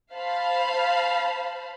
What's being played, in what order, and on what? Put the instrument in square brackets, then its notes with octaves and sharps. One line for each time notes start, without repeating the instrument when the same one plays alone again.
[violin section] C5 F5 A5 B5